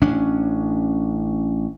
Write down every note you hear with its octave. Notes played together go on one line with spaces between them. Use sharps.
A1 C#4 D4